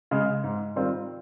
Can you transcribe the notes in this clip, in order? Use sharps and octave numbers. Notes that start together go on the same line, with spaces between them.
C#3 G#3
G#2
D#3 G3 C4 F4